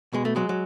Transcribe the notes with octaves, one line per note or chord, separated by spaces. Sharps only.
B2 G#3
A3
F#3 G#3
F#3